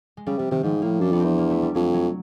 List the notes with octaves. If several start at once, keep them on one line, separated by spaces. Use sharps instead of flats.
G#3
C#3 G3
C3 G3
C3 D#3
G#2 F3
A2 A#3
F#2 D4
F2 B3
C4
E2
A#3
A3
G3
F2 F#3
F#3